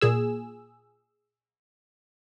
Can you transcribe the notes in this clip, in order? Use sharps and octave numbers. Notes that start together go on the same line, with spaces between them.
A#2 G#4 E6